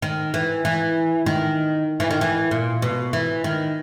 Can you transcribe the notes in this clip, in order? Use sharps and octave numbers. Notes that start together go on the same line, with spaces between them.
D#3
E3
E3
D#3
E3
D#3
E3
A#2
B2
E3
D#3